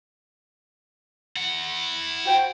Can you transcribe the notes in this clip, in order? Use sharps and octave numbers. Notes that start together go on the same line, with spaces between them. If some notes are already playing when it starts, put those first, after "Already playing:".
E4 F#5
F#4 C5 G5